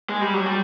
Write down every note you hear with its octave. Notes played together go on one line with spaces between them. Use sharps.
G#3
G3
F#3
G3